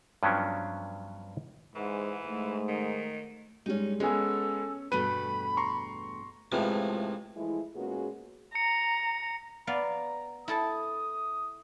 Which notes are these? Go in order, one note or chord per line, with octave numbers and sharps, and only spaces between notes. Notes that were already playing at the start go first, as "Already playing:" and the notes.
G2 F3 F#3 B3 C#4 D4
G#2 E3
G#2 A3
D#3
G#2 G3 G#3 C#4 D#4
G#3 B3 C#4 G#4 A4 G#5
E2 G2 B2 A3 B4 B5 D#7
A#5 C6 C#6
C#2 A2 C3 E3 F3
E3 F3 G#3 A3 E4
A#2 G#3 B3 C#4 F#4 G#4
A#5 C#7
B3 D5 F5 A#5
E4 A4 A5 D#6